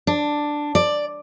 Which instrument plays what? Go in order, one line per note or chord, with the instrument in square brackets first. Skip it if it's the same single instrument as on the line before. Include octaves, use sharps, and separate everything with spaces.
[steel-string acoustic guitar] D4
D5